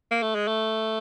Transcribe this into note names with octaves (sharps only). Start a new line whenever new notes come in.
A#3
A3
G#3
A3